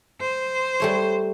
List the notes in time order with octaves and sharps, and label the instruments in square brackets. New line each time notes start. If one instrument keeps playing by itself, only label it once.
[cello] C5
[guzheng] G3 A3 C#5